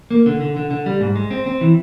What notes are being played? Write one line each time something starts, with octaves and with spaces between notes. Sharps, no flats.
A#3
D3
D3
D3
D3
G3
G#2
G#3
C4
C4
E3